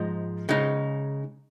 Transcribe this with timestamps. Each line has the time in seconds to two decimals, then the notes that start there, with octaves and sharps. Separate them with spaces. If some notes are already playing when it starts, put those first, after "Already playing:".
Already playing: G#2 F3 G#3 D#4
0.49 C#3 G#3 D#4